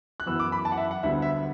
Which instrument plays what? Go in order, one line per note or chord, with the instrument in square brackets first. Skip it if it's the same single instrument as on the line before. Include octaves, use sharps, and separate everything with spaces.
[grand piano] F#6
F#2 E3 B3 E6
D6
B5
A5
F#5
E5
F#5
D2 D3 G3 B3 E5
E5